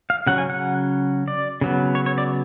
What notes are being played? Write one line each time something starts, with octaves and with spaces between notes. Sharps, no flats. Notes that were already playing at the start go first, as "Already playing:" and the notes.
F5
C#3 F#3 C#4 F#5
G#5
F#5
D5
C#3 F#3 B3
C#5
C#5
D5